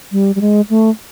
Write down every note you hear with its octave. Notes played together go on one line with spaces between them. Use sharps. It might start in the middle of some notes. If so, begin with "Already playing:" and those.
G3
G3
G#3
A3